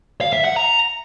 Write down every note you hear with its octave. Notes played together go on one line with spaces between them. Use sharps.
F5
E5
F#5
A#5